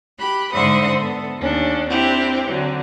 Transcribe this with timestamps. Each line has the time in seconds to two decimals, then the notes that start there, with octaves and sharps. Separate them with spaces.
0.19 G4 B5 F#6
0.53 G#2 D3 C5 E5 F#5 D#6
0.98 B3 A4
1.38 D#2 C#4 D4
1.89 C4 D4 E4 G4
2.47 D3 F#3 C4